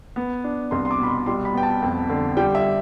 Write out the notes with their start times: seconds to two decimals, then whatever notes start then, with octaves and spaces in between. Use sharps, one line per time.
0.16 B3
0.44 D4
0.71 C2 C6
0.85 C6
0.91 D6
1.00 B2 B5
1.08 C6
1.26 G3 C6
1.45 B5
1.54 B3 G5
1.63 A5
1.82 F2
2.09 D3
2.37 G3 G5
2.55 E5